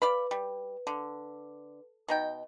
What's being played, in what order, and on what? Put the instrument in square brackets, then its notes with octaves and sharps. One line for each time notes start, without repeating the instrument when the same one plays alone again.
[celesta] B4 [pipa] D5 F5 B5
[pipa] G3
D3
B2 D#4 G5